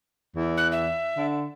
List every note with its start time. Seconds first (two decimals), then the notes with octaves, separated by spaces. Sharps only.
0.36 E2
0.57 F#6
0.72 E5
1.17 D3